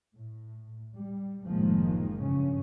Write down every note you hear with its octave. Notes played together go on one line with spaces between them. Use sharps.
A2
G3
F#1 A2 D#3 F3 G#3 A#3
G2 C#3 C#4